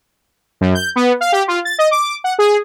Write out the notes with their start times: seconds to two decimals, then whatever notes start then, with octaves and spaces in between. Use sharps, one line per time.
0.61 F#2
0.75 G6
0.96 B3
1.21 F5
1.32 G4
1.48 F4
1.65 A6
1.79 D#5
1.91 D6
2.24 F#5
2.39 G#4